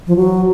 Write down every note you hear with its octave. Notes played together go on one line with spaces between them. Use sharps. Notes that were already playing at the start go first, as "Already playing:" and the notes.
F3
F#3